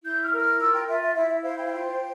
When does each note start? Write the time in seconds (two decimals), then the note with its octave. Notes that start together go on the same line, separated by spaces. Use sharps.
0.03 E4 G6
0.22 F6
0.31 A#4
0.40 F6
0.60 F4 E6
0.73 G5
0.87 F4 E5
1.02 E5
1.15 E4 E5
1.29 E5
1.43 C5 F5
1.58 G5
1.65 F5
1.72 F4 G5